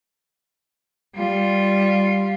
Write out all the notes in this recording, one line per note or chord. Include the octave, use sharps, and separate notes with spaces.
G3 F4